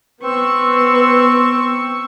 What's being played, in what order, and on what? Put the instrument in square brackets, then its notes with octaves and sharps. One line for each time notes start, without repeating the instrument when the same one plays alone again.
[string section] B3 [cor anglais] C4 [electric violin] C#6 E6